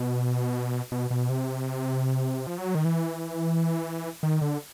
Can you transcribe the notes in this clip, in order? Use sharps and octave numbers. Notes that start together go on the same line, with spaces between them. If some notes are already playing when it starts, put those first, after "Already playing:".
Already playing: B2
B2
B2
C3
F3
F#3
D#3
E3
D#3
D3